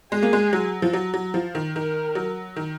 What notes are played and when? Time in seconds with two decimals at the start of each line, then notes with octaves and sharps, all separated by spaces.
0.12 G#3 G#4
0.23 A#3
0.33 G#3
0.53 F#3
0.82 F3
0.93 F#3
1.14 F#3
1.34 F3
1.55 D#3
1.75 D#3 A#4
2.15 F#3
2.56 D#3